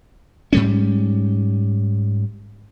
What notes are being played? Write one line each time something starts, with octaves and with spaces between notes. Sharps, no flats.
G#2 G3 C#4